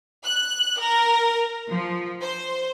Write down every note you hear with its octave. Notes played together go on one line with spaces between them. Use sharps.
F#6
A#4
F3
C5